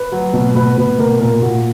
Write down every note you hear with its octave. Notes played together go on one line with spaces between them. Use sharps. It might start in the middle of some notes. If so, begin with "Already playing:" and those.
Already playing: B4
F#3
B2
B2 B4
B2 B4
B2 A#4
A#2 A#4
A#2 F#4